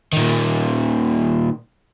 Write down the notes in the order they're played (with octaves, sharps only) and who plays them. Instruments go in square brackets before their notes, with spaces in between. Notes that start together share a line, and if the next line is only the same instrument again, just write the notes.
[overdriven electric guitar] A#2 D#3